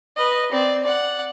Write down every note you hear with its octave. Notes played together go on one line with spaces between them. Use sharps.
B4 D#5
C4 D5
D5 F#5